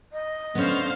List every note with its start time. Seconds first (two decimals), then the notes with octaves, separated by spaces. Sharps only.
0.12 D#5
0.55 D3 B3 C#4 C5 F5